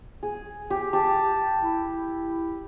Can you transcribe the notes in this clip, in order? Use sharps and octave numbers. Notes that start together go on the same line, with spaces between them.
G#4
G4
G4 A5
E4